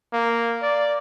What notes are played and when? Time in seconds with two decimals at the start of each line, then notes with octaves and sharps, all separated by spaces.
0.13 A#3
0.62 D5